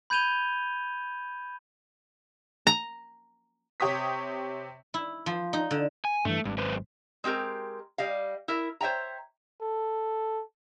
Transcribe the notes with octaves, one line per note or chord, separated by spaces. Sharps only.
B5 G6 G#6 D#7 F7 G7
A#5
C3 G4 C#5 D#6 B6
E4
F3
D#4
D3
G#5
G2 E3 A3
G#1 G2
F#2 B4 C5
G#3 C4 G4 A#4 A#5
G3 D#5 F5
E4 A#4 E5
C5 C#5 E5 G5 A#5
A4